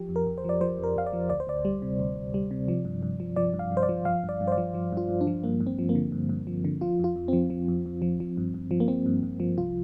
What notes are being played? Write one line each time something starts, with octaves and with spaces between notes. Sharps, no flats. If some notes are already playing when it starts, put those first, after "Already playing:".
Already playing: F3 G4
F2
A#4
F2
C5
F3 D5
F3 C5
F2 A#4
F2 F5
D5
F3
D2 D5
C5
D2 D5
G3
C3
D2
D2
G3
C3
F3
G2
G2
F3
F3 D5
G2
F5
G2 C5
D5
F3
F3 F5
G2 D5
G2
C5
D5
F3
F3
G2 F4
G2
D4
F3
G2 A#3
G2
C4
F3
A#3
D3
G2
G2
F3
D3
F3 F4
F2 F4
F2
F3 C4
F3
F2
F2
F3
F3
G2
G2
F3
A#3
F3 C4
G2
G2
F3
C2 F4